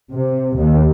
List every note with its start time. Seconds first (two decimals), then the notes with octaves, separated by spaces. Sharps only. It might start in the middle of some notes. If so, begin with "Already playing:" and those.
0.11 C3
0.57 D#2